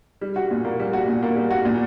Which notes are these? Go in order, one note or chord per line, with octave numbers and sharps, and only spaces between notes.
G3
F#4
A#2
A#3
G3
F#4
A#2
A#3
G3
F#4
A#2